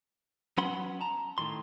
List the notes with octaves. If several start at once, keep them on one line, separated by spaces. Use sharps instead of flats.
F#3 B3 C#4 F#5 B5 C6
A5 A#5
A2 D#3 E3 C6